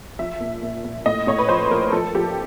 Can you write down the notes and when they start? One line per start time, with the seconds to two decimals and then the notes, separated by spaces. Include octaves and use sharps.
0.19 F3 E5
0.40 A#2
0.62 A#2
0.84 A#2
1.06 A2 D#5
1.27 A2 C#5
1.39 B4
1.49 F3 C5
1.71 F3 A#4
1.92 F3 A4
2.15 F3 G4